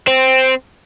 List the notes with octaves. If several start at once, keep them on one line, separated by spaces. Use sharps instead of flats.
C4